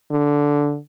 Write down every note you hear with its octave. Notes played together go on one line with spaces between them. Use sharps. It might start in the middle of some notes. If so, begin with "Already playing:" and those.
D3